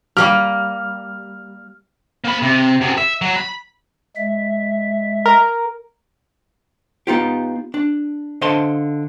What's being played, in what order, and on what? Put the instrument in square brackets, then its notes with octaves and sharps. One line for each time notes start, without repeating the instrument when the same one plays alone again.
[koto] G3 A#3 G4 [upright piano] F6
[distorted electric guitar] A#3 B5
C3
F#2 C3
E5
F#3
B5
[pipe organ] G#3 E5
[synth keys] A#4
[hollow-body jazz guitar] B3 D#4 F4 G4
D4
D3 C5 D#5 F5 A5 C6